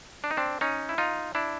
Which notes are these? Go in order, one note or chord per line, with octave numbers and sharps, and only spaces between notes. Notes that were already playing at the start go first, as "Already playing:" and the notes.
D4
D#4
C4 D4
C#4 D#4
E4
D#4 F4
D4 E4